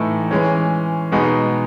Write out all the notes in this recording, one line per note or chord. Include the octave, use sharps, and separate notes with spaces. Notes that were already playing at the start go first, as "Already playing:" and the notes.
Already playing: A2 E3 A3 D#4
E3 G#3 C#4
B2 G#3 B3 D#4